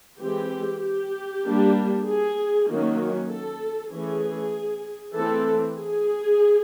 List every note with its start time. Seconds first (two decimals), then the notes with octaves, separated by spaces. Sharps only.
0.20 E3 G#3 C4 G4
0.83 G4
1.45 G3 A#3 D4
2.07 G#4
2.69 D#3 F#3 A#3 C#4
3.30 A4
3.92 E3 A3 C#4 G#4
5.16 E3 A3 C4 A4
5.78 G#4